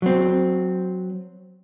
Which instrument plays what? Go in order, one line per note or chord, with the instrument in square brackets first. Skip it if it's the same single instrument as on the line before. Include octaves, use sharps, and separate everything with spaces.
[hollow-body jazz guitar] F#3 C4